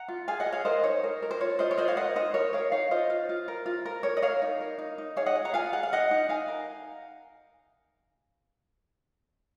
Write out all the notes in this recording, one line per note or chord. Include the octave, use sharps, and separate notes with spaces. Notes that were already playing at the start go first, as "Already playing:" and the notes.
Already playing: F#5 A#5
F4
G#4 F5 G#5
D#5 F#5
G#4
C#5 F5
A#4 C5 D#5
D#4 C#5
A#4
A#4
C5
F4 C#5
F4 C5 D#5
C#5
F4 C5 D#5
C#5 F5
A#4 D#5 F#5
D#4 C5 D#5
A#4 C#5
A#4 C#5 F5
D#4 C#5 F5
F4 C5 D#5
F4
F4
A#4
F4
A#4
A#4 C#5
D#5
A#4 C#5 F5
D#4
A#4
D#4
D#4
G#4 C#5 F5
D#5 F#5
G#4
F#5 A#5
F4 F5 G#5
G#4 F#5
F5
D#4 D#5 F#5
D#4
D#4 F5 G#5
A#4